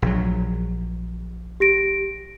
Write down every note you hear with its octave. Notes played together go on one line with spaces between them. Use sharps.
A#1 F#3
G4 A#6 D7